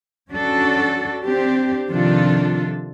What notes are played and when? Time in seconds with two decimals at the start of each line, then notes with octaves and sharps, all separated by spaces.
0.31 C#4 D4 F#4 A4
1.23 C4 D4 G4
1.88 C3 D#3 F3 D4 F4 A4